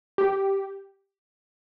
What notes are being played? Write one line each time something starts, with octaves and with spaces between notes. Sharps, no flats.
G4